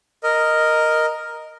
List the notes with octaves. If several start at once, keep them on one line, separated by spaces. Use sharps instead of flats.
A#4 D#5